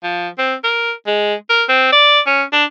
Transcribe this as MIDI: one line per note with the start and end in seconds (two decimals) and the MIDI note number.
0.03 0.28 53
0.38 0.55 60
0.64 0.92 70
1.07 1.34 56
1.50 1.64 70
1.69 1.89 60
1.92 2.20 74
2.26 2.43 61
2.52 2.64 62